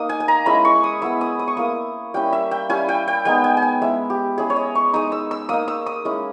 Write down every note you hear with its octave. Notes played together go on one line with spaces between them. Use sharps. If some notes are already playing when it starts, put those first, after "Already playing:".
Already playing: A#3 D#4 D#6
G#5
G#5
A#5
G#3 C#4 E4 B5
C#6
D#6
G#3 B3 E4 E6
D#6
D#6
C#6
A#3 E4 D#6
G3 C#4 E4 G5
E5
G5
G3 C#4 E4 G#5
G5
G5
G#3 B3 D#4 G5
G#5
G#5
G5
G#3 C#4 E4 E5
G4
G#3 C#4 E4 G#4
C#5
D#5
C#6
G#3 D#4 D#6
E6
E6
A#3 D#4 D#6
E6
D#6
G#3 C#4 E4